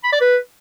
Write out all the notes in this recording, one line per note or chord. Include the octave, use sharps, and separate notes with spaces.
B5
D5
B4